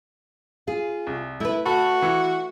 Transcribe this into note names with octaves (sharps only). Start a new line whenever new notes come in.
F4 G#4
C2
A3 E4 B4
F#4 A4 B5
E3 C#7